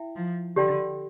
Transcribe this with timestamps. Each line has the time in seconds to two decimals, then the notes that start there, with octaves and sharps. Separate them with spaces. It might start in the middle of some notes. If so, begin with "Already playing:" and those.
Already playing: E4 E5 G5
0.15 F3
0.56 D3 G4 D5 G5